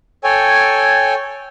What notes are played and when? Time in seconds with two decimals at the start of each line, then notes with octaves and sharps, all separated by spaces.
0.24 A4 C#5 G5 G#5